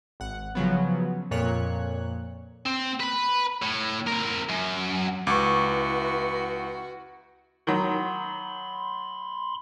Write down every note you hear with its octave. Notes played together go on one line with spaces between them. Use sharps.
G#1 F#5
C#3 F3 F#3 B3
F2 A#2 C#5 F#6
C4
B4 B5
A2
C4 A#4
F#2
C#2 E4 F#4 B4 C#6 D6
D#3 F#3 B5 C6